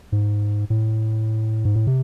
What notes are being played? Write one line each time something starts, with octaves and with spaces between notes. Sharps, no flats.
G#2
A2
G#2
A2
C3